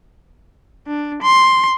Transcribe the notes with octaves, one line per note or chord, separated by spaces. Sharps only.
D4
C6